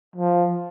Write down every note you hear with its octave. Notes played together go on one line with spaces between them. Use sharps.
F3